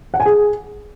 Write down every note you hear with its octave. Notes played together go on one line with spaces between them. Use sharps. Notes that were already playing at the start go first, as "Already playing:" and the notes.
F#5
G#5
G#4